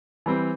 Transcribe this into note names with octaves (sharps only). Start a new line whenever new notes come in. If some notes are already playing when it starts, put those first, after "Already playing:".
E3 G3 C4